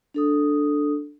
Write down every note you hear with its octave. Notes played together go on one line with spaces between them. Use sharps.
D4 A4 D#6